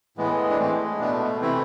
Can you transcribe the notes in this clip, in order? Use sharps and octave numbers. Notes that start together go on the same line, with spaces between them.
A2 E3 G#3 B3
D4
A2 G#3 A3 C4
B2 A3 B3 D4
C3 E3 A3 C4 E4